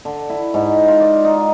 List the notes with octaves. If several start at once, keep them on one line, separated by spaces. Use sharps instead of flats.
D3
E4
G#2
F4
D5
D#4